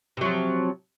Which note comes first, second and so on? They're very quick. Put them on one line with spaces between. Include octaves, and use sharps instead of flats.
C3 F#3 F3